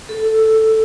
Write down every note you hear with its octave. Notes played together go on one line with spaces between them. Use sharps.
A4